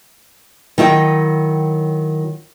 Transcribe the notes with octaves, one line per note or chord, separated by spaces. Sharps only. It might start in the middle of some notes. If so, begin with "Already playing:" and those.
D#3 F#3 E4 D#5 F#5 G5